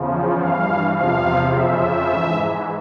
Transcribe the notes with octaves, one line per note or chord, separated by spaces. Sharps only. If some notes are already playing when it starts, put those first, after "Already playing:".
Already playing: E2 C#3 F3
G2 E3 F5
E2 C3 F3 F5
F2 C#3 F3 E5
G#2 E3